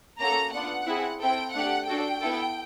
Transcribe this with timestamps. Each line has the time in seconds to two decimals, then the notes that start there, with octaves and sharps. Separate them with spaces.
0.20 A#3 C#4 F#4 A4 A#5
0.53 B3 D4 F4 F#5
0.87 C4 E4 G#4
1.20 C4 E4 A4 G5
1.54 A3 D4 G4 F#5
1.87 D4 F#4 A4 G5
2.21 B3 E4 A4